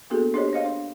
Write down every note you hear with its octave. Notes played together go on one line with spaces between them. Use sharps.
A#3 B3 D4 F#4 G#4 A4
D4 G4 G#4 C5 C#5 D#5
C5 D#5 F5
D4